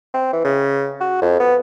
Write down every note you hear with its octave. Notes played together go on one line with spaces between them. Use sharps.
C4
E3
C#3
F#4
F2
B3